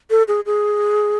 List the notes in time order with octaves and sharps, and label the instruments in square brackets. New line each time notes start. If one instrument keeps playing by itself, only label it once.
[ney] A4
G#4
G#4